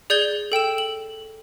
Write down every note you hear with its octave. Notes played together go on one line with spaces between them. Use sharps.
G#4 D5 G6 G#6 G7
A4 G5 E6 E7
F#7